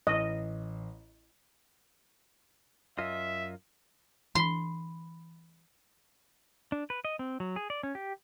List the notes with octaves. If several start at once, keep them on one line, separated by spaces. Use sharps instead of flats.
A1 D#5
F#2 F4 D#5 E5
E3 B5 C6
D4
B4
D#5
C4
F#3
G#4
D5
C#4
G4